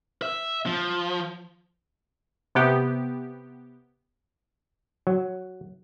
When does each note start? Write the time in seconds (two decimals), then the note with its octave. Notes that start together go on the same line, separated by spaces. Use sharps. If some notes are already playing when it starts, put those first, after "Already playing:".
0.22 E5
0.66 F3
2.55 C3 B3 G4
5.07 F#3